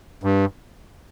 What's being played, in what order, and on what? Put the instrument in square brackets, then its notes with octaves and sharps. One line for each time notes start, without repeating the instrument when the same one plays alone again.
[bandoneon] G2